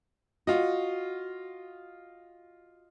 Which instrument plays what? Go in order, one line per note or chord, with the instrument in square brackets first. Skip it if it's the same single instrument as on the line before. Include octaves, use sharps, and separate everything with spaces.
[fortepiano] F4 D#5 [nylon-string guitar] F#4